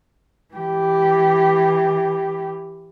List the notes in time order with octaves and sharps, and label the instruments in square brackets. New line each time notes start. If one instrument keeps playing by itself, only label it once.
[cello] E3 G4